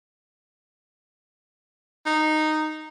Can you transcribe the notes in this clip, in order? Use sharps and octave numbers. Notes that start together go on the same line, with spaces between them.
D#4